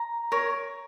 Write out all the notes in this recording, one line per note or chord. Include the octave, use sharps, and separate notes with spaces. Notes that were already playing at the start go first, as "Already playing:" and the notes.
Already playing: A#5
A#4 C#5